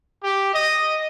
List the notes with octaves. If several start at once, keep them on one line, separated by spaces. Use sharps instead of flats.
G4
D#5